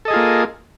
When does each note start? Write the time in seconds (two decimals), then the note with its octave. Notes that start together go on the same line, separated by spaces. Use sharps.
0.05 A4
0.08 D#5
0.11 G#4
0.13 F4
0.16 A#3